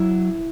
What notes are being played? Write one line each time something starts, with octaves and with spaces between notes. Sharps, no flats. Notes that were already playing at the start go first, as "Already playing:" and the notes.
Already playing: F#3 E4